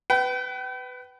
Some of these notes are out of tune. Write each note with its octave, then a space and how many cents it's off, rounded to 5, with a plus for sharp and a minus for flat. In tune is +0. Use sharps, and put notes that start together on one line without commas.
B4 +15 G5 -40